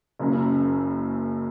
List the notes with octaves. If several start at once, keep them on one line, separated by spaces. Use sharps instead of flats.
F#1 F#2 C#3